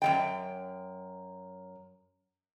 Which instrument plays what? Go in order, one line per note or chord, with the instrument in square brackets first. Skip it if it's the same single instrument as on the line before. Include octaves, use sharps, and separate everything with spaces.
[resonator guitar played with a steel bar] F#2 G#3 G5